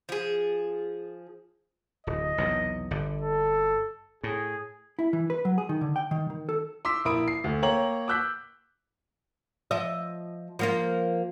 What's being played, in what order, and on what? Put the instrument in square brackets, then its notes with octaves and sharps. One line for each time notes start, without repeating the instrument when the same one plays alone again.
[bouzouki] F3 G#4
[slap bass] D1 [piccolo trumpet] D#5
[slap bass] B1 E2 C3
G1 D3
[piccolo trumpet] A4
[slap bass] A2 [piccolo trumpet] G#4
[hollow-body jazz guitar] E4
E3
B4
F#3
G#4
D#3
D3
G5
D#3
D#3
A4
[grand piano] C6 D6 E6 B6
A#1 E4 A#4 B5 D#6 D7
C7
D2
A#3 C#5 G5 A#5 F#7
D6 E6 F#6 G6 B6
[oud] F3 D#5 E5
F3 A#3 F4